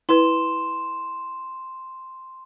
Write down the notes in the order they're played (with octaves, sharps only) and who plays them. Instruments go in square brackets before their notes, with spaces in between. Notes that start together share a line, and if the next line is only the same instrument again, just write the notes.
[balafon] E4 B4 [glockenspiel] C6 E7